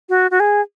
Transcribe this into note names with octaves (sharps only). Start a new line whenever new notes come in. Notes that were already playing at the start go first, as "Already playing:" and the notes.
F#4
F#4
G#4